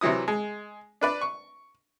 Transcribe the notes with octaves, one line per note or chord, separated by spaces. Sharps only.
C3 E3 F#3 E4 D#6
G#3
D4 B4 D5
C#6